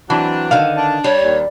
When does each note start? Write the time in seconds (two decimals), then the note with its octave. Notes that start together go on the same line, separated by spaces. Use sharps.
0.10 E3 F#3 C4 D4
0.51 D3 D#3 F5
0.78 D4
1.04 G3 C#5
1.23 D#2